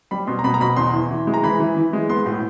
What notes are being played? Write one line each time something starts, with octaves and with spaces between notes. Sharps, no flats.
G3 B5
B2 C6
A#5
B2 B5
A#5
B2 B5
E2 C6
E3
E3
G#3
A#5
E3 B5
E3
E3
G#3
B3 C6
A2